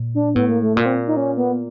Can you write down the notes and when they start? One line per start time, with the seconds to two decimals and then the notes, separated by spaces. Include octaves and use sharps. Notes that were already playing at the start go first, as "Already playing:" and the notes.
Already playing: A#2
0.15 D4
0.35 A2 B3
0.49 A#3
0.63 A3
0.76 A#2 A#3
0.86 C4
1.08 D#4
1.17 C#4
1.37 B3